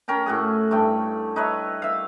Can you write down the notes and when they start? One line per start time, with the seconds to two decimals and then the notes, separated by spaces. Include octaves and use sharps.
0.08 C#4 A#4 G5 A#5
0.26 A2 F#4 G#4
0.71 G2 A3 G5
1.36 D#4 B4 C#5 E5
1.82 E5 F5